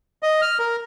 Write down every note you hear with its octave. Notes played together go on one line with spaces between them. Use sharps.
D#5
F6
A#4